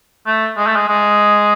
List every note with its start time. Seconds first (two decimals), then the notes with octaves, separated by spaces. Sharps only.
0.27 A3
0.57 G#3
0.67 A3
0.76 G#3
0.87 G#3